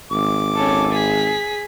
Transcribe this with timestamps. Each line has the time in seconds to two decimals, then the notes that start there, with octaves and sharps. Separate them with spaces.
0.11 G#1 D6
0.56 C#4 A4
0.91 G#4 B6